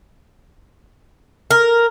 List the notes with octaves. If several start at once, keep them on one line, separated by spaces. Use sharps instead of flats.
A#4